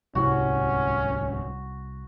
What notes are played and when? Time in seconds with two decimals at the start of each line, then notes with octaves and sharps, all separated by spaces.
0.15 D1 C2 G#2 G3 C#4 F#4